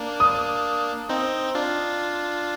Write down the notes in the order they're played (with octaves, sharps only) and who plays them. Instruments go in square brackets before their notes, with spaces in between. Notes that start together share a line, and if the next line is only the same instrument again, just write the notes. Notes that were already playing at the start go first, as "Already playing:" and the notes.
Already playing: [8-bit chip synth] A#3 D4
[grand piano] D#6
[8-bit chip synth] C4 D#4
D4 F4